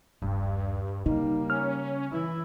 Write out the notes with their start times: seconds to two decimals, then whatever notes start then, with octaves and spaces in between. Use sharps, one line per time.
0.22 D#1 G2
1.06 C#3 G3 A#3 D#4
1.50 C#4 F6
2.12 E3 E4